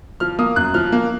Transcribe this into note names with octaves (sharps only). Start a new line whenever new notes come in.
F3 F6
A#3 D#6
F#2 F#6
F3 F6
A#3